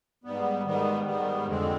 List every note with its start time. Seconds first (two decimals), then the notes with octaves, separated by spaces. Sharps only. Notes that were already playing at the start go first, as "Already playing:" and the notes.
0.24 G#2 G3 B3
0.65 G#2 D#3 G3 B3
1.06 G#2 D#3 G3 B3
1.47 F2 D3 G#3 C4